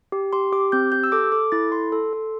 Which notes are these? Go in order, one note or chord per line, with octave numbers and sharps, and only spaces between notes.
G4
G4 C6
G4 D6
C4 G6
G4 G6
E6
A4 D6
A4 D6
E4 A6
A4 C6
A4
A4